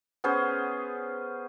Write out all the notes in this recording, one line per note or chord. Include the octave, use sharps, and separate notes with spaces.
B3 C#4 G#4 C5